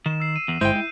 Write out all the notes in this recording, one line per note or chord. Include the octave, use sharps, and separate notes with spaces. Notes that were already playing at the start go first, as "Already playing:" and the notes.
D#3 E7
E6 C7
D#7
E2
G1 G#3 E4 C5 G5 G6 D#7
E4